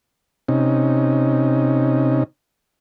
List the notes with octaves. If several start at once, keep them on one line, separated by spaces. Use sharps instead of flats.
C3 C#4 D#4